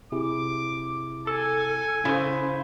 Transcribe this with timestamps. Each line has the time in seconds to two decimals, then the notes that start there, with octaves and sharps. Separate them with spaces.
0.12 C3 E4 G#4 D6
1.27 A4 G#5
2.05 C#3 E4 C5